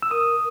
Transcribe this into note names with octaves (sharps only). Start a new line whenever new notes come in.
E6
A#4 D#6